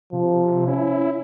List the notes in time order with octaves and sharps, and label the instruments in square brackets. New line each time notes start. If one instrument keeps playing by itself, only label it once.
[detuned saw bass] C3 [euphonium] F3
[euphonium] C#4 [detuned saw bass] E4